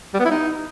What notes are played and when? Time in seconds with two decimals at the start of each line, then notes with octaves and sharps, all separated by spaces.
0.14 G3
0.19 B3
0.25 E4
0.31 D#4